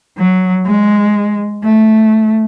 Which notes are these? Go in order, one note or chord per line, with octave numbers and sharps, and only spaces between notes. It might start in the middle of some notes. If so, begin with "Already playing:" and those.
F#3
G#3
A3